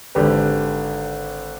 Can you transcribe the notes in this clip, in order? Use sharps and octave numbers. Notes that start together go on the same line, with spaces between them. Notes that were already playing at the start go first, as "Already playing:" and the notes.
G#1 D3 G4 B4